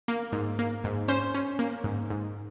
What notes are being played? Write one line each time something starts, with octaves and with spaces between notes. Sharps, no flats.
A#3
G#2
A#3
G#2
C#4 C5
C#4
A#3
G#2
G#2